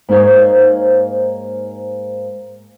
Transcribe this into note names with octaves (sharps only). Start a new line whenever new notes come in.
G#2 A#3 D#4 C5 C#5